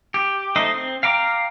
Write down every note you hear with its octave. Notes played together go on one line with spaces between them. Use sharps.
G4
A3 D#4 C5 D#5
C4
F5 G5 A#5 D6